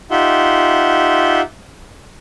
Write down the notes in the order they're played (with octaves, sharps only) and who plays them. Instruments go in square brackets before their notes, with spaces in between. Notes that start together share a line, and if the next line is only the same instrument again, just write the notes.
[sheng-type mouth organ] D#4 F4 G4 E5 F#5 C6